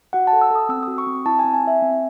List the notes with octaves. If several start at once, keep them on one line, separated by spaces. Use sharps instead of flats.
F#4 F#5
A5
A4
E6
A4 D#6
C4 E6
F#4 D#6
C#6
C4
E4 A5
G#5
C4
G#5
E4 E5
C4